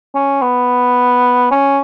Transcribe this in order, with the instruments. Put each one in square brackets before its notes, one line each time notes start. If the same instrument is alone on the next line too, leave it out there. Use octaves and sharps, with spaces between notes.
[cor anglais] C#4
B3
C#4